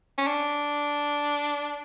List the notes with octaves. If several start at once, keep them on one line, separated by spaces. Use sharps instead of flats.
C#4
D4